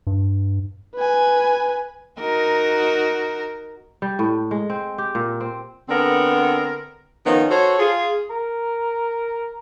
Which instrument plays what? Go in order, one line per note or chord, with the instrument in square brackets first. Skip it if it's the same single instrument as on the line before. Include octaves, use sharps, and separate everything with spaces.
[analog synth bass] G2
[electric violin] B4 G#5
[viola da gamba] D#4 F#4 A#4
[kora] G3
A2
G#3
C4
G4
A#2
C4
[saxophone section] D3 B3 C4 A4 A#4
D#3 F3 B3 C#4 D#4
F#4 A4 C5 C#5
F4 G#4
[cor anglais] A#4